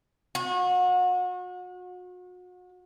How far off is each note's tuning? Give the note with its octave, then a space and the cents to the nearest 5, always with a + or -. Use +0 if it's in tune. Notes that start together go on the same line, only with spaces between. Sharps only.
F#4 -35